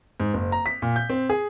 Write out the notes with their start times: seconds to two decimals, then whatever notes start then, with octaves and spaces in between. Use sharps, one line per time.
0.20 G#2
0.34 F#1
0.52 A#5
0.66 B6
0.82 A#2
0.96 G6
1.10 C4
1.30 G#4